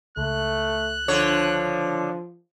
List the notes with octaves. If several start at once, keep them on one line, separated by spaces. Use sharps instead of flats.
C#2 A3 F#6
D3 F3 C#5